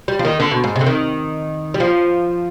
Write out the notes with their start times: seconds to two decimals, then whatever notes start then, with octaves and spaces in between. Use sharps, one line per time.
0.08 G3
0.19 F3
0.25 D#3
0.40 D3
0.51 B2
0.64 G#2
0.76 C3
0.81 D3
0.86 D#3
1.74 G3
1.80 F3